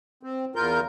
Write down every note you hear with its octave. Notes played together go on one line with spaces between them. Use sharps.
C4
E2 F4 A#4 G6